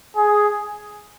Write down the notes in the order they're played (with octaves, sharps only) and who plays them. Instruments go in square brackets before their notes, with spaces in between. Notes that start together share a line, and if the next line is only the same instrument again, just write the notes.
[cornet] G#4